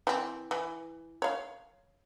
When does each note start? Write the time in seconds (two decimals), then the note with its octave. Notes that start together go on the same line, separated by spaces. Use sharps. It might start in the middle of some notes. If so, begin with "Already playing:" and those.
0.07 E3 C4
0.51 E3
1.22 C#5 F5